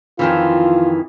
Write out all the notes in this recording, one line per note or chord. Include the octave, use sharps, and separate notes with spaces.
F2 D#3 E3 F4